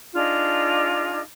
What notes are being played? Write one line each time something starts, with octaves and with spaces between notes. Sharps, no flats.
D4 D#4 F4 G#4